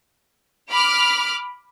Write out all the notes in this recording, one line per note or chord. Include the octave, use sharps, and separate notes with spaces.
B5 D6 F6